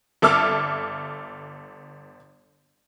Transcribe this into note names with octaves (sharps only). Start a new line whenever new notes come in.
G1 A4 E5 D6 E6 F6